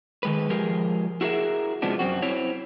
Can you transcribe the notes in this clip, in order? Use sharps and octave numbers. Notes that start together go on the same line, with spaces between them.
D#3 G#3 B4
F3 G#3 G4 G#4 A#4
E4 F#4 G#4 A#4 E5
C3 F3 G#3 B3 D4
F#2 C4 F#4
C4 E4 C#5